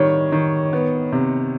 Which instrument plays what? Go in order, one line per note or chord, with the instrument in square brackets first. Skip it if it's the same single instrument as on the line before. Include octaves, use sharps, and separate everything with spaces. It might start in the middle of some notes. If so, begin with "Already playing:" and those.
Already playing: [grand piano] D#3 G3 [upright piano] C#5
[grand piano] D#3
B3
C3